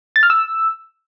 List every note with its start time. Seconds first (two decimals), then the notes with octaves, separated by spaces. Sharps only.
0.16 A6
0.23 F6
0.30 E6